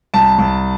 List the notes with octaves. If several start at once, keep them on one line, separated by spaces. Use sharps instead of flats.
C2 A5
C2